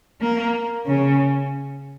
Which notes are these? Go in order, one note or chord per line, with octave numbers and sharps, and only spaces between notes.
A#3
C#3